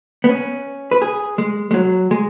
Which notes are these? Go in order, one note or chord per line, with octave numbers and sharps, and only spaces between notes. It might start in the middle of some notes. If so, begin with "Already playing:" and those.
B3
C#4
B4
G#4
G#3
G#3
F#3
G#3